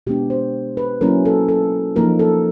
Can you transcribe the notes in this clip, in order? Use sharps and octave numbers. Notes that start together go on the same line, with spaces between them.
B2 G#3 B3 D4 G4
C5
B4
F#3 A#3 C#4 E4 A#4
A4
A4
F3 A#3 D#4 A#4
A4